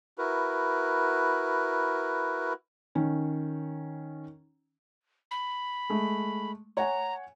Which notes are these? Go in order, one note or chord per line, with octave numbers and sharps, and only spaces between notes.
E4 F#4 A#4 B4
D#3 C#4
B5
G#3 A3
C#5 F#5 G#5 A#5